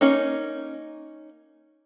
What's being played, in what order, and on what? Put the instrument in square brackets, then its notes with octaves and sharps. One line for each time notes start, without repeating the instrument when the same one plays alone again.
[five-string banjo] A#3 C#4 D#4